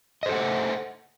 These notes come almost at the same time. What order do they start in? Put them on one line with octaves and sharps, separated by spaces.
D#5 C5 A4 F#5